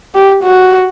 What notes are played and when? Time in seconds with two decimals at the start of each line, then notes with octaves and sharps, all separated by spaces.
0.15 G4
0.43 F#4